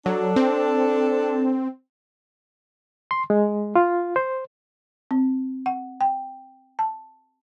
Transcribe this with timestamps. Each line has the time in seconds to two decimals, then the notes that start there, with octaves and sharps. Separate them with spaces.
0.06 F#3 D4 A4
0.36 C4
3.11 C6
3.30 G#3
3.76 F4
4.16 C5
5.11 C4
5.66 F#5
6.01 G5
6.79 A5